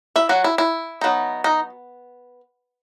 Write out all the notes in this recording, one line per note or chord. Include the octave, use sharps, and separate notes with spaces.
E4 E5
F#3 F#4
E4
E4
F#3 B3 D#4
D#4